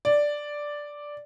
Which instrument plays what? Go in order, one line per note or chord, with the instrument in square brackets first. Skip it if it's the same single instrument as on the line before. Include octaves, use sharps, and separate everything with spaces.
[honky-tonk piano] D5